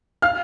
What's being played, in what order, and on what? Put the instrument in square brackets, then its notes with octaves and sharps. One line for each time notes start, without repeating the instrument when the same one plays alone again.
[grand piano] F5 F6